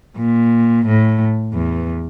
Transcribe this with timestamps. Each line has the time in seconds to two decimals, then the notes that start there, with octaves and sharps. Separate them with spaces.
0.17 A#2
0.86 A2
1.54 E2